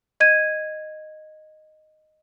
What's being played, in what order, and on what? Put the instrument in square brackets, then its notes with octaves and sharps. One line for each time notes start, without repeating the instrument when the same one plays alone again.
[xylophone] D#5 G#6 D#7